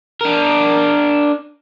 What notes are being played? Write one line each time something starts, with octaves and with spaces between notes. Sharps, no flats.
D4 A#4